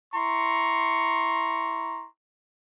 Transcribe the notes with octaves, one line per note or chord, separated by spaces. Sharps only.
E4 A#5 C6 C#6